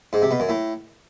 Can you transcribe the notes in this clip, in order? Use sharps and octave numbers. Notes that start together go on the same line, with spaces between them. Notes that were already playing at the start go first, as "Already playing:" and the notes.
G#2
C3
B2
F#2
A2